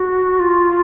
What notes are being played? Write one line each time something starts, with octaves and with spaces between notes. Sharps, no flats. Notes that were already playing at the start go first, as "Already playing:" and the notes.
Already playing: F#4
F4